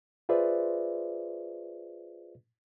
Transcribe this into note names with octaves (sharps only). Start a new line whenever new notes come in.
F4 G#4 B4 C5 D5 E5